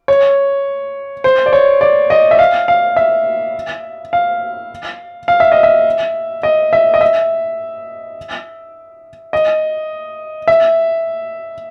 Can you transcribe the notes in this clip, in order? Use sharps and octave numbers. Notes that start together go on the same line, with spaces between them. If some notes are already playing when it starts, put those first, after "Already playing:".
C#5
C5
D5
C#5
D5
D#5
E5
F5
F5
E5
F5
F5
E5
D#5
E5
D#5
E5
D#5
E5
D#5
E5